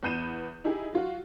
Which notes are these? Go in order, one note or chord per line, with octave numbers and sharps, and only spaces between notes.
E2 B3 G6 D#7 E7
D#4 E4 G4 G#4
F#3 F4 F#4